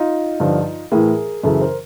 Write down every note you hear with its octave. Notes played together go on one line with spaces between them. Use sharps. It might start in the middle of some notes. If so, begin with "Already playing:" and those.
Already playing: D#4 F4
G2 D3 F3
A2 E3 G#4 A#4
F#2 C#3 E3 A4 B4
A#4 C5